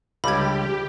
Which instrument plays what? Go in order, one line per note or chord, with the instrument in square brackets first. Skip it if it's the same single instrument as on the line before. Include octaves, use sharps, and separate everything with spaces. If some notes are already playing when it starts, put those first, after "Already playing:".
[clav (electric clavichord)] C#2 D3 G3 [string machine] G4 [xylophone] B5 G#6